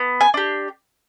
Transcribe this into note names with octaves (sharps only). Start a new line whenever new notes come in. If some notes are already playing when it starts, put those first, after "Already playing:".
Already playing: B3
G#5
D4 G4